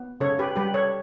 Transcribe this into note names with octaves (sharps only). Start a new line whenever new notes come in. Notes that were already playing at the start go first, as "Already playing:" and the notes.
Already playing: B3
C#3 A4 C#5
G4 B4
G3 G4 B4
A4 C#5